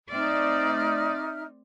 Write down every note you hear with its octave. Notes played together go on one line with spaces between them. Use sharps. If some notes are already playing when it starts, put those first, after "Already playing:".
A3 C4 D#4 D5 E5 F6